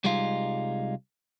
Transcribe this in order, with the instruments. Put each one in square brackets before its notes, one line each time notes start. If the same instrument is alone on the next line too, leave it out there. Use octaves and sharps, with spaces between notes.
[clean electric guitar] C2 G3 G#3 D#4 F4